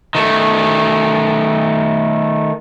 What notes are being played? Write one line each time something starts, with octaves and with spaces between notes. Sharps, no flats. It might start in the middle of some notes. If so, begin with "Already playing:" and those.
D#3 A3